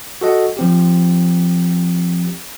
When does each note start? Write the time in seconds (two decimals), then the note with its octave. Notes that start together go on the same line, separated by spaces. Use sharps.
0.21 F#4 A4 D#5 F#5
0.57 F3 C4 G4